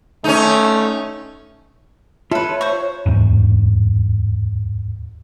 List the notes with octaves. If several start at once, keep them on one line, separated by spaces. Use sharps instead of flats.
A3 C#4 D#4
F4 A4 B4 C#5 E5
C5 C#6
D1 E2 G#2